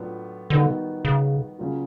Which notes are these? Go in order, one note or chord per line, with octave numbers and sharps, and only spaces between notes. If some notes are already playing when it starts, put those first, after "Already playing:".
Already playing: A2 F#3 B3 D4 F4
D3 D#3 G3 B3 D#4 F#4
C#3
C#3 F#3 A#3 C#4 F4